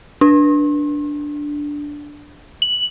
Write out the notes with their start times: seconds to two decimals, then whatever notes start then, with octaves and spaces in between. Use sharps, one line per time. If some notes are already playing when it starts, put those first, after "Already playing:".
0.21 D4
2.62 F#7